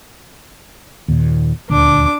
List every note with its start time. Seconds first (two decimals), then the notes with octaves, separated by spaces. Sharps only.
1.08 D#2 A#2
1.70 D#1 D2 D4 D6